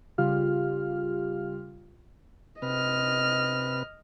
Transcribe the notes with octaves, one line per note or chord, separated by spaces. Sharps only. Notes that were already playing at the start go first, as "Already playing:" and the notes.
C#3 G3 F4 G4 F5 F6
C3 B4 D#5 F6